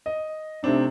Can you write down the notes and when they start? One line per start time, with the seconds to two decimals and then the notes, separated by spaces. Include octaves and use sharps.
0.06 D#5
0.63 C3 A3 C4 D4 D#4